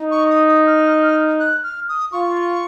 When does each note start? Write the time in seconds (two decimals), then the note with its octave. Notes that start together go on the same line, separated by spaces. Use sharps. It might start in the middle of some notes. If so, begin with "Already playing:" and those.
Already playing: D#4
0.11 C#6
0.31 D#6
0.48 D#6
0.67 F6
1.40 F#6
1.63 F6
1.89 D#6
2.12 F4 C#6